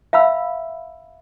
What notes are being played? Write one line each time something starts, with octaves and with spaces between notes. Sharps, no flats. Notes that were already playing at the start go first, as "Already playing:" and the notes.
E5 F5 B5 E6